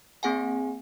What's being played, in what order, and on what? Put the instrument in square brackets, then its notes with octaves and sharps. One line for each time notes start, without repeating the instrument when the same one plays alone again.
[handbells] A#3 C4 G#4 F#5 G#5